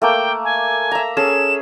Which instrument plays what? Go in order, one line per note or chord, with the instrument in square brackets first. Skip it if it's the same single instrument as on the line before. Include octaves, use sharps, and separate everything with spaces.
[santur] A3 A#3 D6 [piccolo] G5
[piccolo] G#5
[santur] E5 A#5
[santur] C#4 G#4 A4 [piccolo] E7